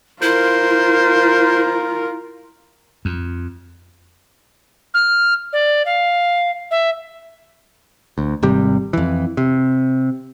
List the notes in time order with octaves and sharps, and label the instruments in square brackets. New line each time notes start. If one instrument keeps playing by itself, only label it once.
[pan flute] E4 [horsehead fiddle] F4 A#4 [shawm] C5
[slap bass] F2
[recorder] F6
D5
F5
E5
[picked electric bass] D2
G#1 C3 G3
F2 E3
C3